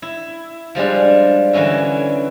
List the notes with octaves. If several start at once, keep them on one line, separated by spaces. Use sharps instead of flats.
E4
F3 G3 G#3 D4
D3 E3 F#3 C#4 E4